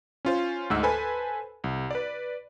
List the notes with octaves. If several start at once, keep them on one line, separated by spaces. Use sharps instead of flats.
C#4 F4 C5
D2 G#2 E6
A4 B4 C5 G#5 B5
C2
B4 D5